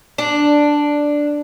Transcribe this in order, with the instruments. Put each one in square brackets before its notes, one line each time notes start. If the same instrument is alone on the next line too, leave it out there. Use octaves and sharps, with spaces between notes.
[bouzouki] D4